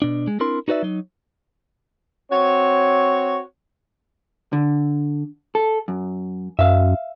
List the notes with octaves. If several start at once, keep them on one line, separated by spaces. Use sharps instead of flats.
B2 D4
G#3
C4 D4 E4 A#4 C6
D#4 F#4 B4 D5 E5
F#3 D#4
C4 F#4 C#5
D3
A4
F#2
F#2 E5 F5